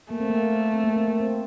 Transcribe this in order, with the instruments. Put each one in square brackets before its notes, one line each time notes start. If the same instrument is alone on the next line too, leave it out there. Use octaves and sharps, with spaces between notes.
[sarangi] A3 [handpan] A#3
[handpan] C4
A#3
C4
A#3
C4
A#3
C4